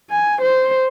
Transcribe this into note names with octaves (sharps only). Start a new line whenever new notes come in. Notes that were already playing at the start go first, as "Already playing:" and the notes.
G#5
C5